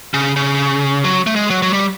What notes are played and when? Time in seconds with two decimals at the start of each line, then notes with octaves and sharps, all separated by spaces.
0.14 C#3
0.36 C#3
1.04 F#3
1.27 A3
1.36 G#3
1.50 F#3
1.62 F#3
1.73 G3